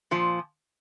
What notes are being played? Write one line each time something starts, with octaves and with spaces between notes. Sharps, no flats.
A#2 F3